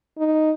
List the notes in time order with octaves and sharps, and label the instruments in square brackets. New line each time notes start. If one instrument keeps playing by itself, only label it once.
[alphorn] D#4